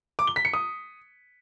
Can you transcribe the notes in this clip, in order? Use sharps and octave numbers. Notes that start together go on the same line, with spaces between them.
D6
G7
B6
C#7
D#6